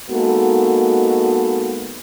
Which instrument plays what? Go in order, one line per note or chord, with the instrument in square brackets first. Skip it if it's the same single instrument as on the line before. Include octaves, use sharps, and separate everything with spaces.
[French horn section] G#3 A#3 B3 D#4 F#4 A4